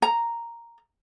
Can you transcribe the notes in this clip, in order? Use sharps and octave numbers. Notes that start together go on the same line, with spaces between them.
A#5